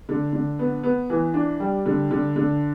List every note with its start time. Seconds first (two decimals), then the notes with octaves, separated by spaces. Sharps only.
0.09 D3
0.33 D3
0.59 B3
0.83 B3
1.10 E3
1.34 D4
1.60 G3
1.86 D3
2.11 D3
2.36 D3